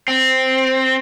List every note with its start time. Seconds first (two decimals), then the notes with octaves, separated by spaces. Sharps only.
0.08 C4